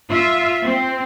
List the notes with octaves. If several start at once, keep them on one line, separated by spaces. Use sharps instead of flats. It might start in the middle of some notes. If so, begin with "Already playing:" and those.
F4 E5
C4